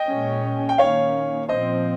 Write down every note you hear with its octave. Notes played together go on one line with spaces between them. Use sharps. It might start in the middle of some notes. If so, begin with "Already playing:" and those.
Already playing: D#5 G5
A#2 G#3 C#4
G5
D#3 A#3 C#4 C#5 F5
A#2 F3 C4 C5 D#5